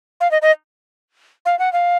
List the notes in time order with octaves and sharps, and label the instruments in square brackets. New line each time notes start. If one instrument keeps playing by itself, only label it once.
[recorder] F5
D#5
D#5
F5
F#5
F5